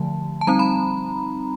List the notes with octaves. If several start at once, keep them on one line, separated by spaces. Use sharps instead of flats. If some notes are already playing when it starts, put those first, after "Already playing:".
Already playing: D3 F3 A3 A5
A5
G3 C4 D#4 A#5
B5